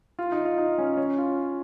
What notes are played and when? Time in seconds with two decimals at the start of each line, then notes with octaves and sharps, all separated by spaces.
0.19 F4
0.32 D#4
0.45 F4
0.58 D#4
0.78 C#4
0.97 C#4
1.18 F4